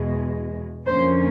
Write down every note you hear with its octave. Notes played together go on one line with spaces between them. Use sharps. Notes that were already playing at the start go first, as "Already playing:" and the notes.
Already playing: E2 B2 G#3
F2 D3 F3 A#3 C#4 C5